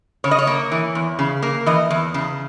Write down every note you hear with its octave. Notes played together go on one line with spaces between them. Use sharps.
C#3 C#5
D#5
C#5
A#3
E3
E2
C#3
A#3
E3 D#5
E2
C#3